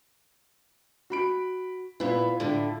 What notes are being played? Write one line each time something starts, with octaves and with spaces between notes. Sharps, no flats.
F#4 B5 D7
A#2 B3 E4 F4 B5
A2 D3